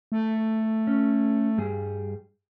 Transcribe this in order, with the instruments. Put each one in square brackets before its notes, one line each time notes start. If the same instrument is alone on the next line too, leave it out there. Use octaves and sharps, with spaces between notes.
[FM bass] A3
[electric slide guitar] C#4
G2 G3 G#4